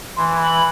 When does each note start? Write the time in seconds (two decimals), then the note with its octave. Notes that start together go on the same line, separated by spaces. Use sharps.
0.17 E3 C6
0.41 B5